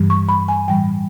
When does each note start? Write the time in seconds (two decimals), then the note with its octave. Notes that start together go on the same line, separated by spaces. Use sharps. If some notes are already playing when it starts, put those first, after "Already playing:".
Already playing: G2 E3 G3
0.10 C#6
0.29 B5
0.48 G#5
0.68 A2 E3 G3 G5